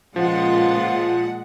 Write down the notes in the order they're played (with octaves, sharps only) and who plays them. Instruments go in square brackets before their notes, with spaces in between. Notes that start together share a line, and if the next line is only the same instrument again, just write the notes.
[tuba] C#2 [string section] A#2 G#3 F#5 [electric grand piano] F3 [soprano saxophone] F4